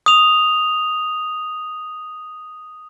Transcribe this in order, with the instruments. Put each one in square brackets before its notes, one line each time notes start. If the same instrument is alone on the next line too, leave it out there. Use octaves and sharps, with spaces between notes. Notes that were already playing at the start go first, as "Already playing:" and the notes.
[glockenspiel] D#6 F7